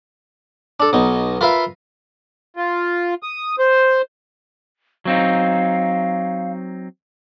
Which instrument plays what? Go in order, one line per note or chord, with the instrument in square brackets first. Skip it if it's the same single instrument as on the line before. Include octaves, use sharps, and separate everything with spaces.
[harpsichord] D4 A4
B1 B2 D#4
F4 A#4 B4 E5 F5
[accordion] F4
D#6
C5
[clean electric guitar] F#3 C4 D#4 [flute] F5